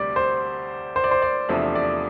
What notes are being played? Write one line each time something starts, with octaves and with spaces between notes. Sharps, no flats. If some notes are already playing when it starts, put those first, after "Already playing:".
Already playing: D2 C3 G3 D5
C5
C5
D5
C5
D5
E2 C3 F3 A3 D4 E5
D5